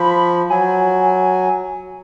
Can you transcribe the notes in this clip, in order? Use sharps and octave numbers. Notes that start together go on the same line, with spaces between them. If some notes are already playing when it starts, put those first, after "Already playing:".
Already playing: F3 B5
F#3 G#5